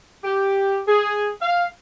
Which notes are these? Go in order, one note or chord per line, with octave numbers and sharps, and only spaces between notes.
G4
G#4
F5